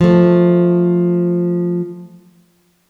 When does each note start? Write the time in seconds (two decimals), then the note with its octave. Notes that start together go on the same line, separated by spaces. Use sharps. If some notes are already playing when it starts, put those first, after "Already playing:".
0.01 F3 A3